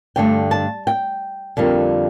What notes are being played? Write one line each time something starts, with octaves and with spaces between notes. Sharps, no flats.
G2 D3 A3 G5
A5
G5
F2 D3 G3 A#3